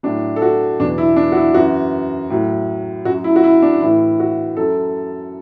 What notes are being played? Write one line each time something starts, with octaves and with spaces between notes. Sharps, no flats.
A2 F#3 D4
A4
F#4
E2 B2 F#3 D4
E4
D4
F#4
E4
F#2 E3 F#4
A2 F#3
F#2 F#3 F#4
E4
F#4
E4
D4
A2 E3 E4
F#4
F#2 F#3 A4